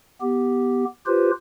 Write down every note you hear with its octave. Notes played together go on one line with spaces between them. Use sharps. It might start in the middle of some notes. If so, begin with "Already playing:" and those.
B3 G4
F4 G4 B4 C5